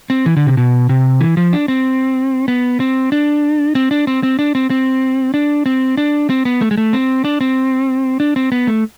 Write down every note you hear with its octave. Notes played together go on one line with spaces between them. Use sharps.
C4
E3
D3
C3
B2
C3
E3
F3
D4
C4
B3
C4
D4
C4
D4
C4
C4
D4
C4
C4
D4
C4
D4
C4
B3
A3
G#3
A3
C4
D4
C4
D4
C4
B3
A3